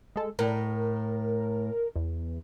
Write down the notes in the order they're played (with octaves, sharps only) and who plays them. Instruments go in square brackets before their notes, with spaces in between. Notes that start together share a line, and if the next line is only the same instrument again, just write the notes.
[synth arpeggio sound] G#3 A4
[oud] A2 [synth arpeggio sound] A#4
[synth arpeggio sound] E2